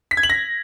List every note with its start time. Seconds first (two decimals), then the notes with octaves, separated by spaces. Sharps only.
0.11 B6
0.17 G#6
0.23 F#7
0.30 A#6